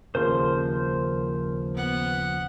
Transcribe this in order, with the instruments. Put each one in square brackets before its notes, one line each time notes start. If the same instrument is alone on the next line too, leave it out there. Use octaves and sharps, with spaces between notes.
[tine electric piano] D#2 C#3 F3 [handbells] A#4 [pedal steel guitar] C5 C6
[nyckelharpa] B3 F#5